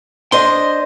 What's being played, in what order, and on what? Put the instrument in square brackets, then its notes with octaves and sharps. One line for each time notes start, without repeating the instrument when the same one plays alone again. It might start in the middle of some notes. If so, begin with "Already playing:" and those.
[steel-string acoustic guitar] D4 C5 D#5 [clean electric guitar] C6